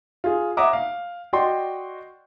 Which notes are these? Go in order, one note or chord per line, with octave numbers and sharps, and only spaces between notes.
F4 G#4
C#5 E5 F#5 A#5 D6 D#6
F5
F#4 D5 D#5 G5 C6